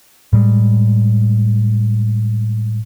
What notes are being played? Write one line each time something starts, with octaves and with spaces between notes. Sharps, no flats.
A2 G3 G#3